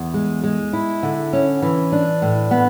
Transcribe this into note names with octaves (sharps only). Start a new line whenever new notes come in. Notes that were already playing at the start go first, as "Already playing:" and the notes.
Already playing: E2
G#3
G#3
E4
D3
C#4
E3
D4
A2
B3